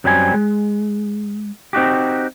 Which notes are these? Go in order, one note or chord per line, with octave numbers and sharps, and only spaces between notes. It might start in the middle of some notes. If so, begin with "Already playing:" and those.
F#2 F#3 G3 C4 G#5
G#3
C4 D#4 F#4 G4